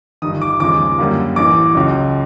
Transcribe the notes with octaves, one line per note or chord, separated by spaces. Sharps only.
G1 G2 D#3 D#6
D6
D#2 C#3 F3 G#3 D6
F#2 D3 G3 A#3
A1 A2 E3 D6
C#2 C#3 F#3